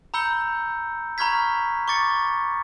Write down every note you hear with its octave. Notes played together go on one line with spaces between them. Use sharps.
A#5 B5 E6 G6 C#7 G7
A#5 B5 C#6 F6 G#6 B6
C#6 D6 A6 C#7